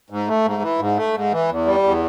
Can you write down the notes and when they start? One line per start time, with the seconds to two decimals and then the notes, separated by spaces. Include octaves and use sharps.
0.10 G#2
0.28 A3
0.44 G#2
0.62 E3
0.79 G#2
0.97 A3
1.14 G#2
1.32 E3
1.48 E2
1.65 G3
1.83 E2